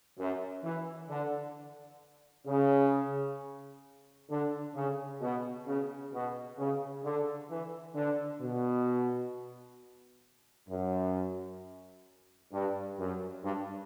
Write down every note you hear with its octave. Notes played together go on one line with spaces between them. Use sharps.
F#2
E3
D3
C#3
D3
C#3
B2
C#3
B2
C#3
D3
E3
D3
B2
F#2
G2
F#2
G2